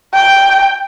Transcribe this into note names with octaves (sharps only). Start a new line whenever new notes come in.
G5